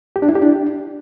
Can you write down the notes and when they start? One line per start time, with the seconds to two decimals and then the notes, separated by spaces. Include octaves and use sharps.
0.16 G4
0.22 D4
0.29 E4
0.35 G4
0.42 D4